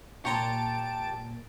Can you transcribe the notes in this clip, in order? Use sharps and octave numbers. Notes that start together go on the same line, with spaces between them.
A#2 G4 C#5 A5 A#5 C6 D7